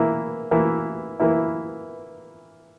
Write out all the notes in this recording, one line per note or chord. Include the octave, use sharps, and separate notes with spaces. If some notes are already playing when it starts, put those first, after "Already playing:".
Already playing: E3 A#3 E4
E3 A#3 E4
E3 A#3 E4